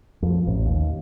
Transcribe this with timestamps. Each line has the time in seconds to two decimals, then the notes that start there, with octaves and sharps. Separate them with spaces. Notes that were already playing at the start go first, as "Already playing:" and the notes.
0.22 F2
0.47 A1
0.66 D#2